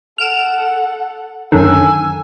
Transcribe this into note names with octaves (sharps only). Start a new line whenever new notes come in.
A4 F#5 F6 D7 E7
F#2 D3 D#3 G#5 E6